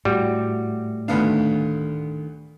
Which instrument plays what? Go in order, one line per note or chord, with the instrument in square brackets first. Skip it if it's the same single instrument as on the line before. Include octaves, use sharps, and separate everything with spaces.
[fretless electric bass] A2 [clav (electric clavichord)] G3 [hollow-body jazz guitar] F#4
[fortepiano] D2 B3 F5 [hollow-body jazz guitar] D#3 A3 D4